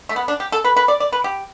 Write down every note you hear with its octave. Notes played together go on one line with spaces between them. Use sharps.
A3
B3
D4
G4
A4
B4
B4
D5
D5
B4
G4